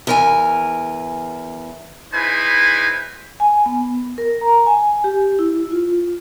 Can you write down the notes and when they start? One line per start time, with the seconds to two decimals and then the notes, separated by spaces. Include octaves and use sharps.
0.07 E2 A#4 G#5
2.14 D#4 E4 G#4 B4 C5 G#5
3.40 G#5
3.66 B3
4.18 A#4
4.41 A#5
4.66 G#5
5.04 G4
5.39 E4
5.72 F4